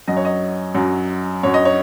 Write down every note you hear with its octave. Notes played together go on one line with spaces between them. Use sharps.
F#2 F#3 D#5
C#5
D#5
F#2 F#3
F#2 F#3 C#5
D#5
C#5